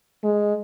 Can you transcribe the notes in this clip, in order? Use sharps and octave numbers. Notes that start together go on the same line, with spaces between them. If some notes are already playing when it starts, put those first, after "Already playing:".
G#3